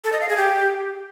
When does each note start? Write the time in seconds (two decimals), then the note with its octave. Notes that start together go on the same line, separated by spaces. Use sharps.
0.04 A4
0.12 D#5
0.21 F5
0.29 G#4
0.37 G4